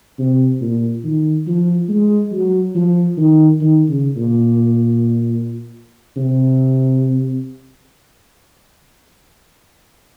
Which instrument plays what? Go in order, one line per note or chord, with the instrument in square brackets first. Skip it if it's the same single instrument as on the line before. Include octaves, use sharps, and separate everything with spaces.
[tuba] C3
A#2
D#3
F3
G#3
F#3
F3
D#3
D#3
C#3
A#2
C3